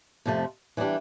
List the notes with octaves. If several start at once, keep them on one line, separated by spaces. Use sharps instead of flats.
F2 C3 F3 A3
E3 G3 B3 D4 G4